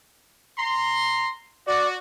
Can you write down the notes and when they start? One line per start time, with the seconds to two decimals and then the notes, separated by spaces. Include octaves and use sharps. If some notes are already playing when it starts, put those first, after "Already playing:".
0.59 A#5 C6
1.68 F#4 D5